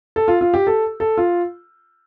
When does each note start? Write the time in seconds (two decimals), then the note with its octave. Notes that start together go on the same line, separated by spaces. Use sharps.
0.16 A4
0.28 F4
0.41 F4
0.54 G4
0.67 A4
1.00 A4
1.18 F4